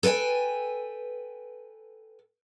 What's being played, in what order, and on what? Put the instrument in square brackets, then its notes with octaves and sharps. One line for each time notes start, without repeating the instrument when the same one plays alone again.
[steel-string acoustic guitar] A4 B4 D5 G5 G#5